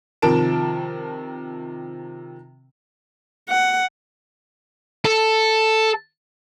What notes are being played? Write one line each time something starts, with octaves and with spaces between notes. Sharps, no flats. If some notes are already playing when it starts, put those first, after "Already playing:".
C3 D#3 F3 A#4 A5 D7
F#5
A4